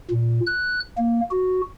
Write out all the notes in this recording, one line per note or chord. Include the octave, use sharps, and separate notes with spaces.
A#2
F#6
A#3
F#4